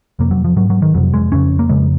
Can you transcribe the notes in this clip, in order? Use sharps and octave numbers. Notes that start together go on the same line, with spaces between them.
F2 C3 A#3
F#3
F3
G#2 F#3
F#3
D#3
F2 C3 F#3
G#3
F2 C#3 C#4
A#3
F2 C#3 G#3